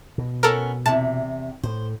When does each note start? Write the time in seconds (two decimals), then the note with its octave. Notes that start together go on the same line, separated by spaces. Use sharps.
0.18 B2
0.43 B3 C#4 A4 A#4
0.86 E2 C3 A5
1.64 A2 C5